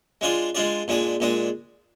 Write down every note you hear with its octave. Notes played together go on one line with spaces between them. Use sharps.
G#3 D4 F4 G#4 D5
G#3 D4 F4 G#4 D5
A#2 G#3 D4 G#4
A#2 G#3 D4 G#4